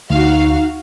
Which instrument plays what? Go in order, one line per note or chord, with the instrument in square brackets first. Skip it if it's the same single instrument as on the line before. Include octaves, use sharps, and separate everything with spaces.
[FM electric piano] D2 [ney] D#4 [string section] F#4 F5